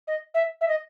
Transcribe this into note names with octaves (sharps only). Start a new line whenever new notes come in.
D#5
E5
E5
D#5